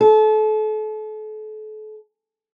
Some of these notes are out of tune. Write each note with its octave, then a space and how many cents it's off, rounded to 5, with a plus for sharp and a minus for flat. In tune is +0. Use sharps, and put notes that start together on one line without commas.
A4 -35